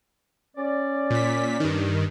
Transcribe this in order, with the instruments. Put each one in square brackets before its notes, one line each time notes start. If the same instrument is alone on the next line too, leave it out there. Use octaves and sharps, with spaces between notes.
[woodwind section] C#4 D5
[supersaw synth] A#2 B6
G2 D#3